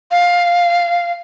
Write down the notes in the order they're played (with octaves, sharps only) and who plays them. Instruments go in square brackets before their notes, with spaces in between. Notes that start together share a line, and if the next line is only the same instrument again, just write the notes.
[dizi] F5